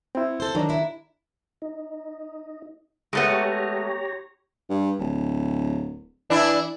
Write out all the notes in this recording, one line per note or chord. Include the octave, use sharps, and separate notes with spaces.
B3 C4 E4
A4 C5
D#3 F#3 D4 F#4 A#5
C3 E4
D#4
G#3 A3 B3 G4 C#5 A#5
G2
D1
E3 D4 E4